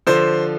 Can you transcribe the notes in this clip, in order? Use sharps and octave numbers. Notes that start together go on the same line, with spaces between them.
D3 F3 C5